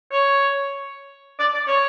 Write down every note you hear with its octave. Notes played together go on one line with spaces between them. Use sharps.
C#5
D5
D5
C#5